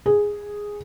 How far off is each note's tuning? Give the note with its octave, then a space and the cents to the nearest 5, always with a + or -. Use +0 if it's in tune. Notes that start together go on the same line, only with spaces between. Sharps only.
G#4 -5